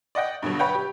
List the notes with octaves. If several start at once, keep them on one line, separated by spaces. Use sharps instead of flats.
D5 D#5 F#5 G5
G2 B2 D3 F#3
B4 C#5 F#5 G5
G4